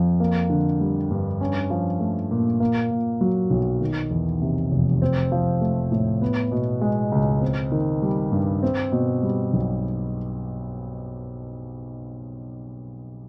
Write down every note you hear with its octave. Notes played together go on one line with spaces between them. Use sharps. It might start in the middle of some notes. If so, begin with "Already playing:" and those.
Already playing: F2 F3
A#3
D3
G3
G2
C#4
F3
A3
A#2
A#3
A#2
F#3
B1
D#3
E2
C3
F1
C4
F3
A3
A2
B3
B2
G#3
C#2
C4
D#3
G3
G2
C4
B2
G3
B1